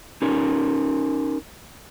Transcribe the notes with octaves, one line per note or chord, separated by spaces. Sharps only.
C#4 D#4 G4 A#4